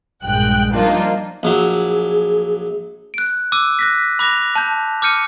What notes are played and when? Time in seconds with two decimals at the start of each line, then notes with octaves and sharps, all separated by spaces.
0.24 A#1 G2 G#3 G5 F#6
0.72 F3 G3 A#3 D4 D#4 F4
1.43 A#1 F#3 G#4
3.14 F#6 D7
3.52 D6 E6 D#7
3.79 F#6 A#6 B6
4.19 B5 D6 F#6 A#6 F7
4.56 A5 G6
5.02 D6 F6 G6 C#7 D#7